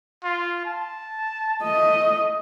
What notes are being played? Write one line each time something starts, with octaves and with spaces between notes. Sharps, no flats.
F4
A5
A3 D#5